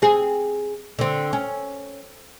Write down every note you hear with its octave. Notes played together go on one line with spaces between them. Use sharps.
C4 G#4
D3 C4
C#4